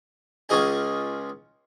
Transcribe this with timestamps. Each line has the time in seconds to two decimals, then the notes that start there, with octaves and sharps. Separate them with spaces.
0.49 C#2 C#4 F4 G#4 D#5 G#5